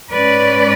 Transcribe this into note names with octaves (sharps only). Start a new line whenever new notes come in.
G#2 G#3 C#4 B4 D5